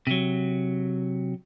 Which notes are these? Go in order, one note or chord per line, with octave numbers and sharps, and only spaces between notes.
C3 F#3